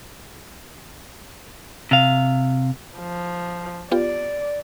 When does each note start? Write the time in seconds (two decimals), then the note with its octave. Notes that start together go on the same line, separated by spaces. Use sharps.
1.91 C3 F5
2.99 F3
3.92 B3 F4 G4 D5